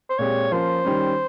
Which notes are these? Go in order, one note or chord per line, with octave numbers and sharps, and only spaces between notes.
C5
A#2 G#3 C4 G4 C#5
F3 A#3 C#4 F4 C5
D#3 G3 C#4